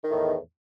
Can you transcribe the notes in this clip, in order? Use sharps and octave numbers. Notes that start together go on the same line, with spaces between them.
E2 A2 D#3